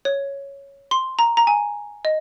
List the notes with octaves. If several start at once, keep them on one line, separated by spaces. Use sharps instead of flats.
C#5
C6
A#5
A#5
G#5
D#5